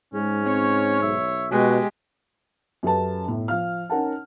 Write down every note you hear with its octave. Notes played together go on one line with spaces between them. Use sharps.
G#2 G#3 C#4
C4 C#5
B1 E5
B2 G#3 F#4 G4
F#2 F#3 G4 A4 B4 A5
B1 A2
F3 F5 F6
C#4 D#4 A#4 F#5 A5